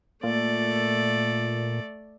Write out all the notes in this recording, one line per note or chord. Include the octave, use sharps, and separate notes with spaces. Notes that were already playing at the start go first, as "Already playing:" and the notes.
A#2 A3 D5